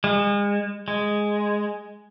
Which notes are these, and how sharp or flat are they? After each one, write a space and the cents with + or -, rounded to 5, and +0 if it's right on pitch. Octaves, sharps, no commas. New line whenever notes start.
G#3 -35
G#3 +0